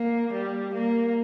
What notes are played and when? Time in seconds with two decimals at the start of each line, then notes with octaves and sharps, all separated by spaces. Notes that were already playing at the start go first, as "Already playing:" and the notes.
Already playing: A#3
0.33 G3
0.74 A#3